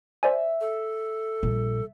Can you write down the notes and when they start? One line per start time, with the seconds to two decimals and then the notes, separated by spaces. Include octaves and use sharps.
0.23 C5 D5 E5 G#5
0.61 A4
1.43 A#1 G3